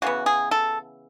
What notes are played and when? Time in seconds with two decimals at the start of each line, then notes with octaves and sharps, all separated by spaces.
0.02 C#3 E3 B3 F#4
0.26 G#4
0.51 A4